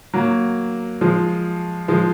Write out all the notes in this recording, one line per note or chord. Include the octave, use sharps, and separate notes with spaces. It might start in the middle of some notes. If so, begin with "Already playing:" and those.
F#3 A#3
F3 G#3
F3 G#3